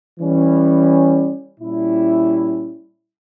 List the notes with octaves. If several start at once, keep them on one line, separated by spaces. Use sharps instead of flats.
E3 G3 C#4
A#2 G3 C#4 E4